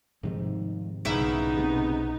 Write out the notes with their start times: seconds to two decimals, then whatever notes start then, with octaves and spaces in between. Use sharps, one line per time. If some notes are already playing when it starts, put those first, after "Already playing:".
0.23 G#2 C3 D#3 F3 A3 C4
1.05 B1 C#3 B3 D#4 E4
1.57 C3 A3 C4